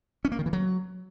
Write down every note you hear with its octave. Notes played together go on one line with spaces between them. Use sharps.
C#4
A#3
D#3
E3
F#3